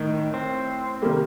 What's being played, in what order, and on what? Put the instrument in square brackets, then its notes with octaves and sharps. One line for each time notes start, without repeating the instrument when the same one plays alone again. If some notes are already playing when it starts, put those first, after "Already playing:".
Already playing: [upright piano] A2 A3 [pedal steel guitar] D#3
[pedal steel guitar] C4
[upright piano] C3 D#3 G3 A#3